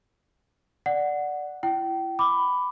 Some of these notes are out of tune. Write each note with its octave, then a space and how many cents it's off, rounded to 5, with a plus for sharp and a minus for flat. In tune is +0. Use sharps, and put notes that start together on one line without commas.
D5 +0 F#5 +0
E4 +35 G5 -30
B5 +10 D6 +0